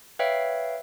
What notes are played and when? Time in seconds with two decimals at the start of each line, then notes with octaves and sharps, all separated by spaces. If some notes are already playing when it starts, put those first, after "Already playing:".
0.19 B4 C#5 E5 F5 G5